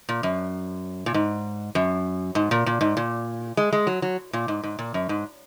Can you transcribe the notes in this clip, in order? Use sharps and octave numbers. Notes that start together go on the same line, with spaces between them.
A#2
F#2
A#2
G#2
F#2
G#2
A#2
A#2
G#2
A#2
G#3
G#3
F#3
F#3
A#2
G#2
G#2
A#2
F#2
G#2